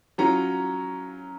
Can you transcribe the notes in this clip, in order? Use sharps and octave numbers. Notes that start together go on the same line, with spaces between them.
F#3 C#4 F4 A#5